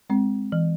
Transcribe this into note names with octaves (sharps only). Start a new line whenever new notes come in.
G#3 C4
E3